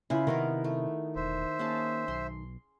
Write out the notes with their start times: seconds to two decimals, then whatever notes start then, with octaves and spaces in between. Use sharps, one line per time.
0.10 C#3 E4 F4 B4
0.27 C3 D#3 B3 A#4 B4
0.64 A3
1.16 E1 C5 E5
1.59 A#3 C#4 G#4 A5
2.08 B1 C6